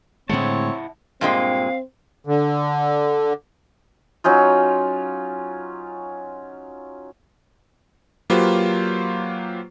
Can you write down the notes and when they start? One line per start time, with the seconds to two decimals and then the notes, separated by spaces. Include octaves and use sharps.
0.29 A2 D3 G#3 C4 E4 C#5 F#5 A5
1.21 G2 A#2 G#3 C4 F5
2.27 D3
4.24 F#3 C#4 D#4 F4
8.30 F#3 A#3 F4 G4 B4 C5